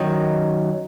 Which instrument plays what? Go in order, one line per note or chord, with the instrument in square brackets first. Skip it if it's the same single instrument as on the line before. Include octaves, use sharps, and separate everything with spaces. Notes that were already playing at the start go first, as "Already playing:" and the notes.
Already playing: [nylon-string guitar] F#2 D#3 F#3 D#5